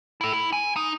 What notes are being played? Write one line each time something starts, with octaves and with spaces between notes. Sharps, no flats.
E4 A4
E4
G#5
D#4